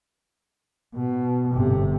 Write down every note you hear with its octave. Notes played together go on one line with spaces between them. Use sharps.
B2
G1 C3